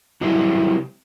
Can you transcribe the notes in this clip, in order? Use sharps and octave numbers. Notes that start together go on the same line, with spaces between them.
C3 F#3 G3 A#3 C4 E4